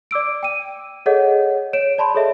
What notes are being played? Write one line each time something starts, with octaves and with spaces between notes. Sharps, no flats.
D5 D6 E6 D7
G5 D#7
G#4 A4 C#5 D#5 F#5
C#5 D7 E7
D5 A5 B5 C6
G#4 A4 C#5 D#5 E5